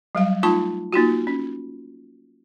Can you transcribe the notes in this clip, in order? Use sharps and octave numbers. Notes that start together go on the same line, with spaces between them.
F#3 G3 F5
A3 D#4 F4 A5 C#6
A#3 D#4 F4 F#4
C#4